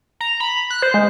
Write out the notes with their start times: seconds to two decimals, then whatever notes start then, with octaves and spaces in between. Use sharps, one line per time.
0.21 A#5
0.40 B5
0.70 F#6
0.82 C5
0.94 G#3